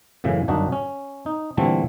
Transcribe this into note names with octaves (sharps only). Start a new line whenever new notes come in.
F#2 A2 C#3 E3
G1 F#2 D4 D#4 F#4
C#4
D#4
A#2 D3 E3 G3 A3 C4